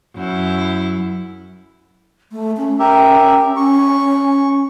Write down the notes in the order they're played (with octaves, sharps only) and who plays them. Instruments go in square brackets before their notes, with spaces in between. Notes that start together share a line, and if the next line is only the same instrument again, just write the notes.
[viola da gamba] F#2 E4
[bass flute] A3
C#4
[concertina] G4 A#4 E5
[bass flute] C#4 [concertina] C#6